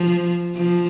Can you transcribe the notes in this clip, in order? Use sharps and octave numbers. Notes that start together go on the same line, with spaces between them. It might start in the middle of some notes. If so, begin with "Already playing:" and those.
Already playing: F3
F3